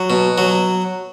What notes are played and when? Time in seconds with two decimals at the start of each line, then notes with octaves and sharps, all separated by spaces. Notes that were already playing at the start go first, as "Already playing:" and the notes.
Already playing: F#3
0.10 B2
0.38 F#3